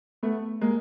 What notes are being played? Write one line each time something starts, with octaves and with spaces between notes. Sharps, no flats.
A3 B3
G#3 A#3